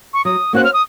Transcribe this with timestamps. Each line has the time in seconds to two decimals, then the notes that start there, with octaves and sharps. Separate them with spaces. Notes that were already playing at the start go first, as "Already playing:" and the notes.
0.13 C#6
0.25 F#3 D#6
0.53 A#3 C#4 F#4 C5 F#6
0.64 F6
0.73 D#6